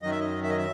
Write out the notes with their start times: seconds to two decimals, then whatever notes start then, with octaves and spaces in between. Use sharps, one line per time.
0.02 F#2 D#3 F#3 D#5
0.11 E5
0.20 D#5
0.43 E5
0.49 D#5
0.58 E5